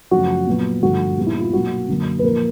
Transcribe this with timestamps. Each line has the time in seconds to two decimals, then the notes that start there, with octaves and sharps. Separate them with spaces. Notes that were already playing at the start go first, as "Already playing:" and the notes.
0.11 F#2 C#3 F3 A3 F#4
0.46 A#2 F#3 B3
0.82 G2 D3 F3 A3 F#4
1.17 A#2 G3 B3
1.27 E4
1.40 F4
1.52 B2 F#3 A#3 F#4
1.88 F#2 D3 F#3 A#3
2.19 B4
2.23 A#2 F3 A#3 A#4